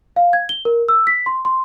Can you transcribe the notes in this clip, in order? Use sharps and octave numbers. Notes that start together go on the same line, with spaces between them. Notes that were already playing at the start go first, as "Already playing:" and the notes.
F5
G#6
G7
A#4
E6
B6
C6
C6